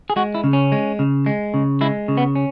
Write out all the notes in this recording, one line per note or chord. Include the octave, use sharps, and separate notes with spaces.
G#4
G#3 F#4
E4
C#3
C#4
G#3
C#3
G#3
C#3
G#3 E4
C#3
B3
C#4